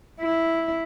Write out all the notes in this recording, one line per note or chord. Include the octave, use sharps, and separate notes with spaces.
E4